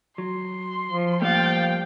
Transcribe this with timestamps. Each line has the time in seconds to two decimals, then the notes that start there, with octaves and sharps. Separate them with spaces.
0.18 F#3 C6
0.90 F3
1.22 F3 G3 A3 A#3 F5 G5 A6